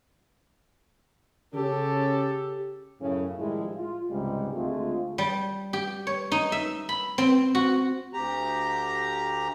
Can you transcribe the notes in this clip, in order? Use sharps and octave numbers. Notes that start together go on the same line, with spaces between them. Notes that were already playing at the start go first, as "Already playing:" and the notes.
C#3 C#4 G4 A4
F#2 A2 C#3
A2 D#3 F3 G3 G#3 E4
F4
C#2 G#2 C3 G3 G#3
D2 G#3 A3 C4 F4
G3
G4
C#5
D#4
E5
B5
C4
F#4
D2 G4 A#5